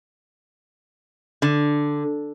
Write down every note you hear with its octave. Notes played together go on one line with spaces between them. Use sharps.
D3